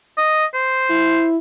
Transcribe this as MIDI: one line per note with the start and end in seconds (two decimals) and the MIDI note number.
0.18 0.46 75
0.54 1.27 72
0.90 1.37 64